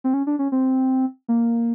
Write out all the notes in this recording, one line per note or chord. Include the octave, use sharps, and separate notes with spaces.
C4
C#4
D4
C#4
C4
A#3